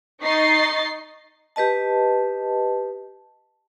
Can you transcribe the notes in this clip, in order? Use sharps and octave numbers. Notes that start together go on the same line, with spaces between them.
D#4 D#5 C#6 A6 C7
G4 B4 D#5 A5